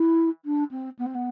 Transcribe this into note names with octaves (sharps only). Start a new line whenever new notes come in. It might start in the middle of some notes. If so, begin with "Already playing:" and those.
Already playing: E4
D4
C4
B3
C4
B3